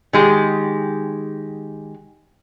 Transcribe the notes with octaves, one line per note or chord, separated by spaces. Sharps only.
D#3 G#3 G4